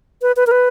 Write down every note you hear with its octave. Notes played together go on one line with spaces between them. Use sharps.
B4
B4
A#4
B4